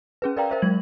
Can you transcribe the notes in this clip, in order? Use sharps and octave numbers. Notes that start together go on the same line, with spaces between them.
C#4 G#4 B4
A#4 B4 D5 F5 G5 A#5
A#4 C5 E5
F#3 G#3 G#6 F#7